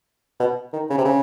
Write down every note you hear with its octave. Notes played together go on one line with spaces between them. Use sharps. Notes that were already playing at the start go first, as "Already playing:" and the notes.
B2
D#3
C#3
C3
C#3